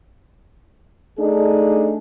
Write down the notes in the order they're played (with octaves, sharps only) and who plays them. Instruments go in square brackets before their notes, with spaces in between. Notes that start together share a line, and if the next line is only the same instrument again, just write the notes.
[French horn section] A3 D4 D#4 G#4